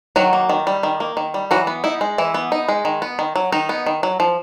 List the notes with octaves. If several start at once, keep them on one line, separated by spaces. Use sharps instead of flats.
D#3 F#3 F#4
A#3
D#3
G3
D#3
A#3
D#3
G3
E3 F#3 F#4
B3
D#4 E4
G#3
E3 E4
B3
D#4
G#3
D#3
B3
D#3
F#3
D#3 D#4
B3
D#3
F#3
F3